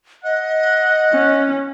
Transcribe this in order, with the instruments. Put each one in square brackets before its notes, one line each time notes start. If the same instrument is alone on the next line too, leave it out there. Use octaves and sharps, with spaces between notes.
[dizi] D#5 [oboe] F#5
[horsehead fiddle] C#4